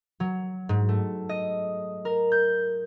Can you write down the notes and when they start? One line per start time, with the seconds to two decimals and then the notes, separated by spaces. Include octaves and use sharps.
0.20 F#3
0.69 G#2
0.89 A3
1.29 D#5
2.05 A#4
2.32 G6